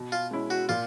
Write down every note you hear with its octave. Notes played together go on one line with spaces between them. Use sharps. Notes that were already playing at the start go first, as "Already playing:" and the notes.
Already playing: B2
F4
G#3 C#4 E4
F#4
A#2 F4